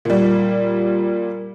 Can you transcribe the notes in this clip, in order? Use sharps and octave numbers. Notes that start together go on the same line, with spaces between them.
A#2 G3